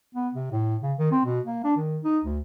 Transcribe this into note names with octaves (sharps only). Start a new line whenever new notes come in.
B3
C3
A2
C#3
D#3
C4
B2
A#3
D4
D#3
D#4
D2